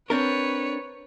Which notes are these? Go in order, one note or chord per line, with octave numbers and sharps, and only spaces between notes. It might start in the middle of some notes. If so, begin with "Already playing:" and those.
C4 D4 A#4 B4 C#5